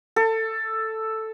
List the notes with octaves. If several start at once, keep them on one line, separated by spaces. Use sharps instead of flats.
A4